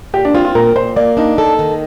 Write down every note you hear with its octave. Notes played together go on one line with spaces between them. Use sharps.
A#2 G4
D4
C4 F4
F4
A#2 A#4
A#2 C5
A#3 D5
D4 D#4
A4
D#3